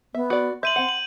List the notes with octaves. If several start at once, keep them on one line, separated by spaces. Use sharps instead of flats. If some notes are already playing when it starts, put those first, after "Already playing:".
B3 E5
F#4 D5
E5 C6 G6 D#7 F#7
C4 F#5
F#7